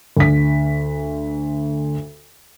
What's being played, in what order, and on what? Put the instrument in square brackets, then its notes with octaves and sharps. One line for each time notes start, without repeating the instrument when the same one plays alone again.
[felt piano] D2 B6